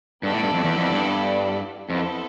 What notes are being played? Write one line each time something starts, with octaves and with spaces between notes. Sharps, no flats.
G2 B3 E4 A4 D5
A2
G2
F2
E2
F2
G2
F2 B3 E4 A4 C5